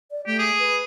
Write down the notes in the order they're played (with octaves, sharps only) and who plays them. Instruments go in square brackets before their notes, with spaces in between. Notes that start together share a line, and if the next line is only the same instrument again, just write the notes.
[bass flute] D5
[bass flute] A3 [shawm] G4
[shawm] G#4
[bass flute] B4